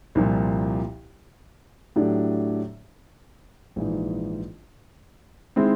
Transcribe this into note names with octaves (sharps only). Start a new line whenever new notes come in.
C2 A#2 F3
A2 F#3 A3 D4 G4
A#1 G#2 E3
D#3 G#3 C4 E4